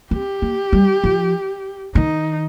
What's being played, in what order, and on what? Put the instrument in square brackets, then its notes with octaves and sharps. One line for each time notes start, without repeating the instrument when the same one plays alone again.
[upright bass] C4 [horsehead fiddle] G4
[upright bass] A#3
G3
F3
[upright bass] D#3 [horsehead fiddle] D#4